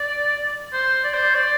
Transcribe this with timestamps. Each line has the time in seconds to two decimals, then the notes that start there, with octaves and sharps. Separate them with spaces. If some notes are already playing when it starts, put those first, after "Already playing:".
Already playing: D5
0.73 C5
1.04 D5
1.14 C5
1.35 D5